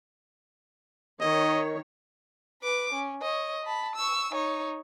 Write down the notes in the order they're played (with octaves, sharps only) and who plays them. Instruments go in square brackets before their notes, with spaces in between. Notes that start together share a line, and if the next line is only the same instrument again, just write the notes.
[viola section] D#3 C#5 [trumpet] D#5
[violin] B4 D6
C#4
C#5 D#5
A5 B5
C#6 E6
D#4 C#5